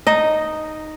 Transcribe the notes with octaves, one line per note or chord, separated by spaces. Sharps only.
D#4 D#5